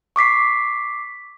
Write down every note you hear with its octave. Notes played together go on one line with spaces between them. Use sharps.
C#6 D6 B6 C7